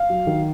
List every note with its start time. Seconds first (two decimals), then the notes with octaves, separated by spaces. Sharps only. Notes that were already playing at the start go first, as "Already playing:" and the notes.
Already playing: F5
0.10 F#3
0.27 D#3